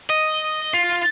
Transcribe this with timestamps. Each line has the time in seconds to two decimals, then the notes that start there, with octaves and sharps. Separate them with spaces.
0.10 D#5
0.73 F4